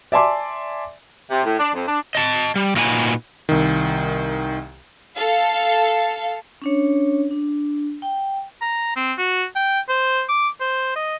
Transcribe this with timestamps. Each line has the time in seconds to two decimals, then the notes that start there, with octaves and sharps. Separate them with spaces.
0.12 D5 E5 G#5 A5 C6 D6
1.30 C3
1.44 A2
1.58 D4
1.74 F2
1.87 D4
2.15 D#5 A5
2.56 G3
2.76 A#2 D#4 F#4 B4 G#5
3.49 C2 D#3
5.17 A4 F5
6.62 C#4 D4 C#5
7.31 D4
8.02 G5
8.61 A#5
8.96 C4
9.18 F#4
9.55 G5
9.89 C5
10.29 D6
10.60 C5
10.96 D#5